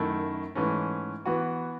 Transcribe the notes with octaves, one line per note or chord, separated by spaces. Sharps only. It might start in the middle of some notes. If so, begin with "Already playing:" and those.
Already playing: F#2 D#3 A3 E4
G#2 E3 A3 C#4
E3 B3 F#4